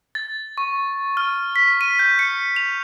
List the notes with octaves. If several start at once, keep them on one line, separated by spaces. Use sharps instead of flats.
A6
C#6
F6
B6
D#7
G6
C#7
F7